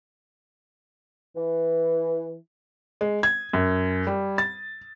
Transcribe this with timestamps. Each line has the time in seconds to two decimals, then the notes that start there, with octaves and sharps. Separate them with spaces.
1.35 E3
3.01 G#3
3.23 G#6
3.53 F#2
4.07 G3
4.38 A6